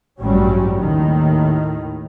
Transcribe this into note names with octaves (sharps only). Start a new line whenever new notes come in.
A1 G2 F#3 G3 C#4
D#2 A2 D#3